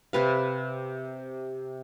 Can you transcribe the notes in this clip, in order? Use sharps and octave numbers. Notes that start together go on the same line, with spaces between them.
C3 B4 F5